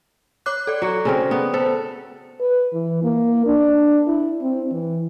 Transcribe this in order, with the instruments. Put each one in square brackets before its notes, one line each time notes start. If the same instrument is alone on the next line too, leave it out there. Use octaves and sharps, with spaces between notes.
[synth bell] C#5 D6 F#6
A4 D5
[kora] F#3 F#4
C#3 C4 A#4
B3
[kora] A4 [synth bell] C5
[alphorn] B4
E3
A#3
D4
E4
C4
E3